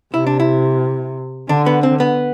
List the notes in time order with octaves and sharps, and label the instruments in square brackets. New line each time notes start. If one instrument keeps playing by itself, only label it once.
[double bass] C3 [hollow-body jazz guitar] E4
[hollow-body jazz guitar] D4
E4
[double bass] D3 [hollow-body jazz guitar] D4
[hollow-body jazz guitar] B3
C4
B3